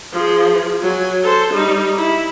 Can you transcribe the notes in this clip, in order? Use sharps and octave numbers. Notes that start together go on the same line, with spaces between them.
F3 G#4
F#3 G#5
A4 C5
G3 D#4
E4